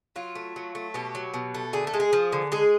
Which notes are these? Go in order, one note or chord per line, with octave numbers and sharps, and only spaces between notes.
F#3 F4
A3
F#3
A3
B2 G4
F#3
B2
A3
D3 G#4
A4
G#3
G#4
F3
D3
G#3 G#4